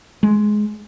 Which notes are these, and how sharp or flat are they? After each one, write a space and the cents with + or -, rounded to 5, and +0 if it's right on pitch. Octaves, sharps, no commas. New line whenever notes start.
G#3 +15